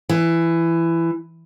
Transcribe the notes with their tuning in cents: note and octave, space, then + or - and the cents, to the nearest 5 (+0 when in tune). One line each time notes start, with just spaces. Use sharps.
E3 +15